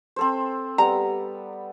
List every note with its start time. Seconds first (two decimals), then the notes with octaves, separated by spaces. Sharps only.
0.16 C4 A4 C5
0.78 G3 B3 A#5